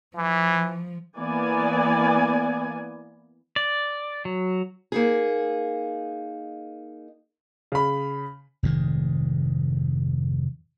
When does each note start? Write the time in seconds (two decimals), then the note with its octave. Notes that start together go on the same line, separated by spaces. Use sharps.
0.17 E3 F3
1.17 E3 A#3 B3 D5 G#5
3.56 D5
4.25 F#3
4.92 A#3 D#4 G#4
7.72 C#3 B5
8.63 F1 G#2 D#3